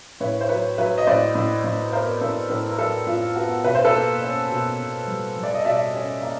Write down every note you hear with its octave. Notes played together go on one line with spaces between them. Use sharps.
A2 B4 C#5
C5
F#3 B4 C#5
F#3 B4 C#5
D#5
A2 C5 D5
A2
A2
B3 A#4 C5
A2 A4 B4
A2 A4 B4
A#4
F#3 A4 B4
A2 F4
B3 F#4
B2 B4
C5
A4 B4
A#3
C#4
B2
B2
G3
G3
D5
D#5
B2 D5 E5
C#4
A#3